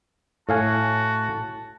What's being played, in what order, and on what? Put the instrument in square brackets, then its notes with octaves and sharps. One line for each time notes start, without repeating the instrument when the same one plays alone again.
[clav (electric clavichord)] A2 F5 G#5 [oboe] F#4 [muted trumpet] A5